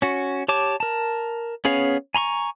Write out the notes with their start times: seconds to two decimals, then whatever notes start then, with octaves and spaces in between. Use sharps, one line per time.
0.02 C#4 F#4
0.48 G4 C#5 A5 D6
0.80 A#4 A5
1.65 B3 C#4 G#4 C#5 F5
2.15 G#5 A#5 C6 C#6